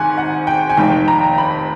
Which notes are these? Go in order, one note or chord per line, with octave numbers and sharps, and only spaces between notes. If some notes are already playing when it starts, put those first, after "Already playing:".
Already playing: G#1 G#2 D#3 F#5 G#5
F#5
G5
G#5
F1 D#2 D#3 G5
A#5
B5